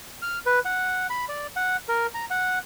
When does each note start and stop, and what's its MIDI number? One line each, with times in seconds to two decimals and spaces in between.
0.22 0.39 89
0.46 0.59 71
0.65 1.07 78
1.10 1.25 83
1.29 1.47 74
1.56 1.77 78
1.89 2.07 70
2.14 2.25 82
2.30 2.59 78